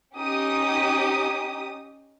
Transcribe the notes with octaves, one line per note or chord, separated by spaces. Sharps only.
C#4 D#4 G4 D#6